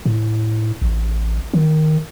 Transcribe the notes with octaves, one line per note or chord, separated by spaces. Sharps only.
A2
A1
D#3